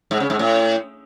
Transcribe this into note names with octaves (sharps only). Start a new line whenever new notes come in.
G#2
C#3
G#2
A2